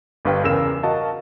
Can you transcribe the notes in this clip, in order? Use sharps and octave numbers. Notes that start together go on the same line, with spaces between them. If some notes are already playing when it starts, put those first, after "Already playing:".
G1 G2 B4 F5 G5
E2 C#3 A#4 E6 E7
F#4 A#4 D#5 F5 A5